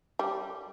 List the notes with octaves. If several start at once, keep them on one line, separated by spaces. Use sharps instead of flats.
G3